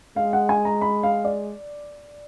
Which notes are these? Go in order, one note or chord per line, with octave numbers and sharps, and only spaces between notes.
G#3 F5
F#5
G#5
A#5
B5
F5
D5